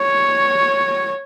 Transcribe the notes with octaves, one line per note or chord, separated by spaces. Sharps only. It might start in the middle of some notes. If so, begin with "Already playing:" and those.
Already playing: C#5